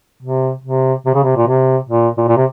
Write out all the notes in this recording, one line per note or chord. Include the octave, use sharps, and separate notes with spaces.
C3
C3
C3
C#3
C3
A#2
C3
A#2
A#2
A#2
C3